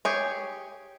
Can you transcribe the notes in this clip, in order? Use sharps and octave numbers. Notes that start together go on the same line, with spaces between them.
G4 G#4 C#5